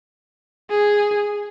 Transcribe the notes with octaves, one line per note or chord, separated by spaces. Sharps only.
G#4